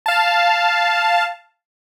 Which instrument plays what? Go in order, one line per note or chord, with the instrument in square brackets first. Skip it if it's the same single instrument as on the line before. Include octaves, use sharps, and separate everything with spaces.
[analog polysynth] F5 A5